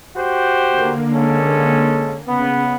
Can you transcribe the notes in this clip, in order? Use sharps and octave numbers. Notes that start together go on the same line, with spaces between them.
F#4 G4 C5
D3 A#3
G#3 C#4 A4
C#3 B3